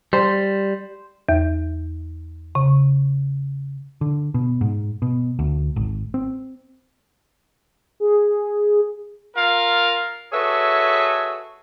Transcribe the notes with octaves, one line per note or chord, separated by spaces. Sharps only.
G3 C5
E2
C#3
D3
B2
G#2
B2
D2
G#1
C4
G#4
F4 A#4 F5
F#4 G#4 A4 B4 C#5 E5